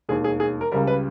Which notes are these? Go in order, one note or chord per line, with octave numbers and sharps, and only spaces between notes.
E1 D#2 D#3 G#4
G#4
G#4
A#4
C#2 C#3 G3 A#4
B4